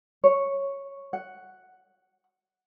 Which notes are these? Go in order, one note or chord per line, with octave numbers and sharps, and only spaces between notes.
C#5
F#5